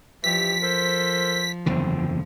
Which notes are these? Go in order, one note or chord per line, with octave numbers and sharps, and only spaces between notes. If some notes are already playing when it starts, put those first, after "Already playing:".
G2 E3 F3 G4 B6
A4 A#4 C5
F#1 E2 D3 C4